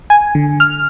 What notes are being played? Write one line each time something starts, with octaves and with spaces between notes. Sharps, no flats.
G#5
D3
F6